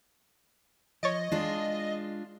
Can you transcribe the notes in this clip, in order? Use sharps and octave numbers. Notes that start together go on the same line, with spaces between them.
F3 C#5 D#5 A6 D7
G#3 D4 F4 G#4